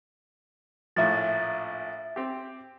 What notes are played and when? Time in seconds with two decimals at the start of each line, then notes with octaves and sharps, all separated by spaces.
0.96 A#1 A2 F3 E5 A6
2.16 C4 G4